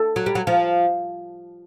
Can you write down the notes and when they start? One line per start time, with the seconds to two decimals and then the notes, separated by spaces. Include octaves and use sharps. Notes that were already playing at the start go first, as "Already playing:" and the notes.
Already playing: A4
0.16 F#3
0.26 G3
0.35 F#3
0.47 F3